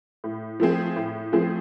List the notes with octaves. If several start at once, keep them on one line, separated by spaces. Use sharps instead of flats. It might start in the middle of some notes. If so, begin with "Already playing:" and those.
A2
F3 A3 C4 G#4
A2
F3 A3 C4 G#4